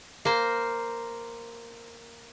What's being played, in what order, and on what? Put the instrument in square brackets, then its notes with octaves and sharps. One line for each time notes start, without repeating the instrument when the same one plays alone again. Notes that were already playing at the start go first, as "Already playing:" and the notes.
[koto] A#3 C5